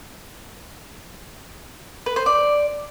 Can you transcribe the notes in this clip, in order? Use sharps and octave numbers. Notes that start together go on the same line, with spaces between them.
B4
C5
D5